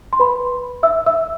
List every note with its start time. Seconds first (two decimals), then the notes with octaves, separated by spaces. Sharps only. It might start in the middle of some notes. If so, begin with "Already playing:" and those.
0.13 C6
0.20 B4 B5
0.83 E5 E6
1.06 E5 E6